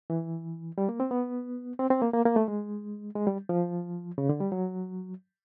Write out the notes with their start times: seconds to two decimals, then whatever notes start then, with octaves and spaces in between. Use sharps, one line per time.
0.10 E3
0.78 G3
0.89 A#3
1.00 C4
1.11 B3
1.79 C4
1.90 C4
2.02 A#3
2.14 A#3
2.25 A#3
2.36 A3
2.48 G#3
3.16 G#3
3.27 G3
3.49 F3
4.18 C#3
4.29 D3
4.40 G3
4.52 F#3